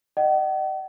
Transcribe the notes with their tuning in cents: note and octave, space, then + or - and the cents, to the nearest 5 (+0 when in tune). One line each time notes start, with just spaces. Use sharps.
D#5 -30 F#5 +45